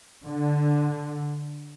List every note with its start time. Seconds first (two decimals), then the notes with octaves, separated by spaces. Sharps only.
0.23 D3